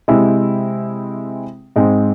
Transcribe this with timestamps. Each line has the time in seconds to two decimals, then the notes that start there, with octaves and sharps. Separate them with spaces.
0.08 C3 G#3 C4 E4
1.76 G#2 G#3 C4